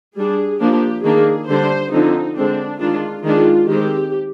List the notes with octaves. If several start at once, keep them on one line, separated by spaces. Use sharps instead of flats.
G3 D4 G#4
F3 A#3 D4 G4
D#3 A#3 D4 G#4
D3 G3 D4 C5
D3 F3 C4 D#4
D3 G#3 C4 D4
D#3 G#3 D4 F4
D#3 G#3 D4 F4
D#3 G#3 C4 G4